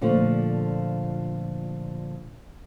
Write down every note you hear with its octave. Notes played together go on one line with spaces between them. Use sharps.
A#2 D3 F3 A3